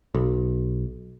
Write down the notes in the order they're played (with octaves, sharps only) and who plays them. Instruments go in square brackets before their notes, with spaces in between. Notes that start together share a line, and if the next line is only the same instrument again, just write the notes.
[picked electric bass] B1